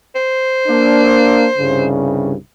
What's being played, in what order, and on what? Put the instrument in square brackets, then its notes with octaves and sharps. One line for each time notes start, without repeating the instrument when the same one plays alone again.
[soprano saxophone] C5
[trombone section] A#3 D4
C2 G2 C#3